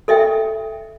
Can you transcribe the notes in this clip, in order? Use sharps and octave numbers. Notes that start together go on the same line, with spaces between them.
A4 D#5 E5 G5